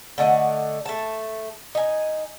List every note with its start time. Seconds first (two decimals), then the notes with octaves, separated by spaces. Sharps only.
0.18 D3 A3 D#5 F#5
0.86 A3 A5
1.75 D#4 G#5